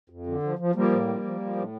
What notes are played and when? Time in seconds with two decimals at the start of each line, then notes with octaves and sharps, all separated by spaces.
0.10 F2
0.27 D3
0.43 F3
0.59 F3
0.75 F3 G3 A#3
0.91 A2
1.08 F3
1.24 F3
1.41 F3
1.56 A2